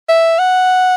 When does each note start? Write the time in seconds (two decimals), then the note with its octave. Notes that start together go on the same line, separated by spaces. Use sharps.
0.09 E5
0.39 F#5